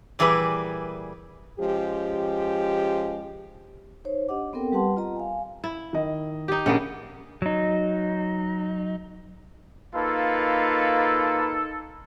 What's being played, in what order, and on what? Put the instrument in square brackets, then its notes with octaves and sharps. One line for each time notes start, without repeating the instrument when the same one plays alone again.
[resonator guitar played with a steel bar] A#2 E3 G3 G#4 B4
[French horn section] F3 G#3 C#4 G4
[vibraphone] D#4 C5 C#5
D4 G4 D#5 F#5 D6
B3 C4 A4 A#4 G5
G3 G4 B4 F#5 A5 C6
F4 D#5 A#5
F5 G#5
[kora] E4
[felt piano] D#3 D#5
[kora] D#4 G4
[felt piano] A#1 [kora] A#3 B3 C#4
[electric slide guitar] F#3 D#4
[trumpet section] A#3 F4 B4 [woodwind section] D#4 A4